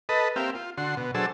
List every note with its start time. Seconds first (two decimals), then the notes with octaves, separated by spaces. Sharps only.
0.09 A4 B4 D#5
0.36 A#3 C4 G4 E5 F5
0.55 F4
0.77 D3 F#4 C6
0.97 B2
1.15 F#3 D4 G#4 A4 C5 E6